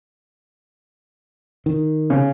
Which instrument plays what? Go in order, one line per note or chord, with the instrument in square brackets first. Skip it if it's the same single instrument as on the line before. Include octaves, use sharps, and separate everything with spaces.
[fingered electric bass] D#3
[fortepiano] C#3